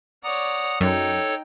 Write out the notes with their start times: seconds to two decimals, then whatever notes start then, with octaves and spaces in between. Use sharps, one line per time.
0.23 C#5 D5 F#5 A#5 D#6
0.80 F#2 D#4 A4 C#5 G5